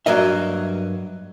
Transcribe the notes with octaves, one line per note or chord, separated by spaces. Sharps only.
G2 F3 F#3 A#3 D#5 E5